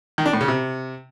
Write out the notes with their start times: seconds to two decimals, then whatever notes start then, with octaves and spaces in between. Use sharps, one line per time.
0.18 D#3
0.26 D4
0.33 A2
0.41 C#3
0.48 C3